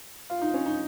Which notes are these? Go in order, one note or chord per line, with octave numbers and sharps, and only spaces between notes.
F4
D#4
C#4
D#4